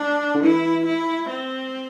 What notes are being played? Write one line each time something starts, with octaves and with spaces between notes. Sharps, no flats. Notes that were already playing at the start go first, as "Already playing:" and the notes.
Already playing: D4
D3
E3 E4
E4
C4